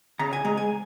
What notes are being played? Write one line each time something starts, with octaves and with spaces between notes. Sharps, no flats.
C#3 A#5
G#5
G#3 A#5
G#5